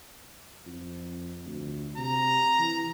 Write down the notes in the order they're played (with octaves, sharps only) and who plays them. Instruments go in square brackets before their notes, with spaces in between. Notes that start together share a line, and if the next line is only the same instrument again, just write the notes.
[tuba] F2
D2
[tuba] C3 [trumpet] A#5
[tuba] E3